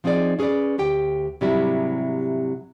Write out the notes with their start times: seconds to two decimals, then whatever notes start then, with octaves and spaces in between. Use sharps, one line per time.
0.04 F3 C4 D#4 G#4 D5
0.39 C#4 G#4 A#4 B4 D5
0.78 D2 G4 G5
1.41 G#2 C3 F#3 G3 D4 E4